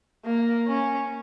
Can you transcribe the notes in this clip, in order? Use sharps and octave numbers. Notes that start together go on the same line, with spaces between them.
A#3
C#4